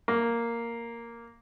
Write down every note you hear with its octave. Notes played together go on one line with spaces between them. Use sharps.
A#3